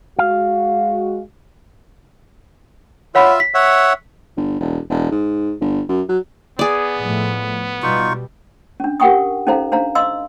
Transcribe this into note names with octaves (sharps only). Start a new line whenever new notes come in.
G#3 F#4 F5
F4 C#5 E5 F#5 B5
B6
C#5 E5 F#5
G1
E1
E1
G#2
G1
F#2
F#3
B3 G#4 D5
A2 F3 A3
B2 G3 D#4 F4 C#6
C#4 D4
G4 A#4 F#5 G5 C#6 D#6
C#4 D#4 A4 C5 F5 A#5
D4 C5 F5 A#5
D#5 F5 C6 E6